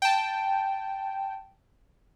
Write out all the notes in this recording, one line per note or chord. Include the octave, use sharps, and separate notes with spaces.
G5 A5